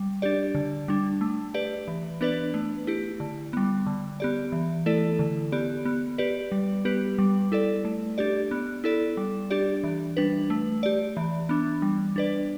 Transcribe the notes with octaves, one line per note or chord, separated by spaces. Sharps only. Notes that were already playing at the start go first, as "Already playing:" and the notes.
Already playing: G3
D4 G4 D5
D3
G3 D4
A3
G4 B4 D5
E3
B3 D4 B4 D5
A3
E4 G4
D3
G3 B3
D3
B3 G4 D5
E3
A3 E4 A4 D5
D3
B3 G4 D5
B3
G4 B4 D5
G3
B3 G4 B4
G3
E4 A4 D5
A3
D4 G4 D5
B3
E4 A4 D5
G3
D4 G4 D5
E3
G3 D4 B4
A3
G4 D5
E3
B3 D4
G3
D4 B4 D5